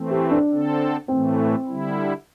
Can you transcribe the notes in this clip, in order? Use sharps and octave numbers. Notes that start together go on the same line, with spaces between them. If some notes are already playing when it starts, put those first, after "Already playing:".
Already playing: E3 A3 C4
G4
D4
D3 C4 A4
A2 E3 A3 C4
D3 G3 E4